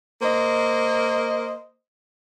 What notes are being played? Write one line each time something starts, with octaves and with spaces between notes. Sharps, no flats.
A#3 C5 D#5